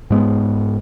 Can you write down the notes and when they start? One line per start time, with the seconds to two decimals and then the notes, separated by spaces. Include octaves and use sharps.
0.10 G#2 G#3 B3